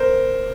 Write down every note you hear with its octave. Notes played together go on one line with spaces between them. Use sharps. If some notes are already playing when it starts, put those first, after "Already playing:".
Already playing: A#4 C5